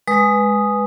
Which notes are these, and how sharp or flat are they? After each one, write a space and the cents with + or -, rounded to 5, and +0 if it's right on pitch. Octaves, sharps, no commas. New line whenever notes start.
G#3 +0 B4 +0 D#6 +0